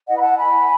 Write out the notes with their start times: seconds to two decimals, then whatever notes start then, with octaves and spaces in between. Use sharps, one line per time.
0.08 E4 B4 D#5 F#5
0.17 B5
0.21 F#5 A5
0.36 G#5 B5